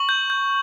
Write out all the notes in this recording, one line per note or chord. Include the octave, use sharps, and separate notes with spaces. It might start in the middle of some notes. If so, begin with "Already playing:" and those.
Already playing: C#6 F#7
G6
G6